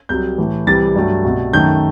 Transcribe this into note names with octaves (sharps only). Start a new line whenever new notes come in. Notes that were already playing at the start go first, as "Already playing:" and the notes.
C2 C3 F#3 G6
A2 E3 A3
C2 C3 E3 G3 A6
G2 F#3 A3
C2 B2 A3
F#2 D#3 A3 G6